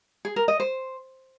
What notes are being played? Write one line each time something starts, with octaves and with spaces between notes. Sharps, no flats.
G#4
A#4
D#5
C5